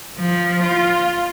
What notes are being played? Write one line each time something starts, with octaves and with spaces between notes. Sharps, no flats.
F3
F4